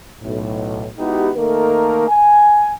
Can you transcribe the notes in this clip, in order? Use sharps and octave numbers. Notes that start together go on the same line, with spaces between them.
B1 A2
G#3 B3 D#4 E4 F#4 G4
D#3 A3 A#3 D#4 A4 A#4
G#5